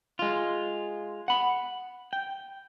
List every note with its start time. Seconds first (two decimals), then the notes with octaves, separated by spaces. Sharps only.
0.19 G#3 F4
1.28 F#5 B5
2.13 G5